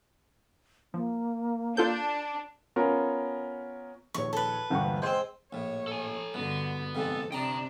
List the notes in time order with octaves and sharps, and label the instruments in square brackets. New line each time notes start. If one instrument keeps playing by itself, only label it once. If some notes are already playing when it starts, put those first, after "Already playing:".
[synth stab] F3 [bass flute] A#3
[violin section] D4 [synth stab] F4 A4 G6
[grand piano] B3 C#4 F4 A#4
[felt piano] A#1 D#2 C#5 [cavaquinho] C#6
[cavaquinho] A4 B4
[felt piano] E1 G5 C#6 [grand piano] D2 G2 A#2
[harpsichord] G#3 C4 [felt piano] C5 [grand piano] C6 G6
[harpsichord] A#1 A2 [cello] C#5
[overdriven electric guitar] A4 G#5
[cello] G2 D3 [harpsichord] B2 [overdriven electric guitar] B3
[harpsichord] F2 G#2 C3 [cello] A4
[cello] C3 D4 [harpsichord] D#5 [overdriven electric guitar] G5 A#5